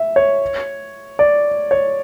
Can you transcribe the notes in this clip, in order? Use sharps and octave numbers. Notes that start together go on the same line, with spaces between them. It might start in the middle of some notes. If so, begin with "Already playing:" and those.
Already playing: E5
C#5
D5
C#5